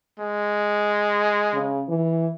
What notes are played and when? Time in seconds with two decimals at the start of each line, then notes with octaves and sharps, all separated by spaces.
0.19 G#3
1.54 C#3
1.89 E3